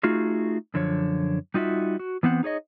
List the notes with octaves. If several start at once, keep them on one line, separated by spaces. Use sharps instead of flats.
A3 D#4 F4 F#4 G#4
F#2 D3 F3 C#5
G3 D#4 F4 F#4 E5
F#4
E3 B3 C4 F#5
D#4 G#4 C#5 D#5